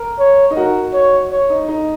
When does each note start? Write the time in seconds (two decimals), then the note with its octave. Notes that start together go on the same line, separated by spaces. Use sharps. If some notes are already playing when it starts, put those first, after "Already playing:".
Already playing: A#4
0.20 C#5
0.50 D#4
0.56 F#4 A#4
0.93 C#5
1.31 C#5
1.50 D#4
1.68 D#4